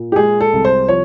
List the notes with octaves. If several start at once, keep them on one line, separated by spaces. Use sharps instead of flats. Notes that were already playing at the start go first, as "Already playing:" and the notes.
Already playing: A#2
G4
G#3 G#4
A4
C2
C5
F3 C#5